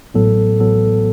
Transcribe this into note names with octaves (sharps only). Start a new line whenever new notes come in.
A1 A2 F#3 B3 A4
A1 A2 F#3 B3 A4